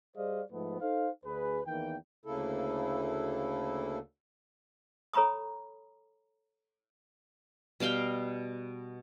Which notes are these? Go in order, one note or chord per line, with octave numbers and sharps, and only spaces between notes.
G3 G#4 C5 D5 D#5 F5
G#2 F3 A3 B3
D#4 A4 C5 F5
D2 G#4 B4
E2 D#3 E3 A#3 G5
D2 C#3 A#3 E4 A4
A4 C#5 A#5 B5 C#6 D#6
B2 G3 F5 G5